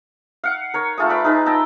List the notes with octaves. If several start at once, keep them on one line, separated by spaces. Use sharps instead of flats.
F5 F#5
A#4 C#5
A3 F4 G#4 D#6
B4 D5 B5
D#4 G#4 B4
G5 A5 A#5 E6